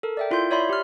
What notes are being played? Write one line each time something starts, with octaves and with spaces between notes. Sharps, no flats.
A4 A#4
D5 E5 G5
E4 F4 A#4 C6 G6
C#5 D5 E5 B5 C6
G4 F6